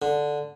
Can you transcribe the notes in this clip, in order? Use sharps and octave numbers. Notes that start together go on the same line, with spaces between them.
D3